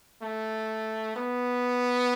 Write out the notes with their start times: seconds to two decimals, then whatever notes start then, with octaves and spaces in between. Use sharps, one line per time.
0.22 A3
1.16 B3